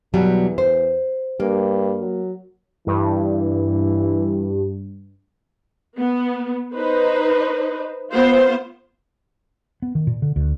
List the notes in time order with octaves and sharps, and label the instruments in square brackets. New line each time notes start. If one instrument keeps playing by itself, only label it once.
[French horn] E2 [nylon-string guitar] B2 F#3 G3
[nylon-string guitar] C5
[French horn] G2 [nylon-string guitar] A#3
[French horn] F#3
[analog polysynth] G2 [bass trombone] E3
[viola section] B3
D#4 B4 C5
B3 F4 C5
[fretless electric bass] B3
D#3
A#2
D3
D2